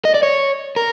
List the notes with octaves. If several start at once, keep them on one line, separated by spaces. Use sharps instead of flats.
D#5
D5
C#5
A#4